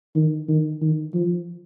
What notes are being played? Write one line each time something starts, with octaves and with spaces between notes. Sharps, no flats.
D#3
D#3
D#3
F3